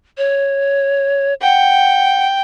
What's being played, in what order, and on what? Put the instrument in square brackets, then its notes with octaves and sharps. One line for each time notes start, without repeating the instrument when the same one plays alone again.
[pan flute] C#5
[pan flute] F#5 [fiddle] G5